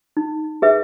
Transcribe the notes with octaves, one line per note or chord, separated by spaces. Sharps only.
D#4
G#4 B4 E5